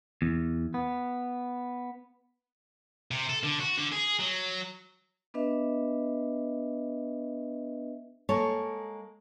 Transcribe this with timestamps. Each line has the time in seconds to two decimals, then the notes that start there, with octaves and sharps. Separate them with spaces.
0.22 E2
0.74 B3
3.11 C3
3.29 A4
3.43 D3
3.60 F#4
3.78 D3
3.92 G#4
4.19 F#3
5.34 B3 D4 B4 D#5 E5
8.29 G#3 A#3 A4 C#5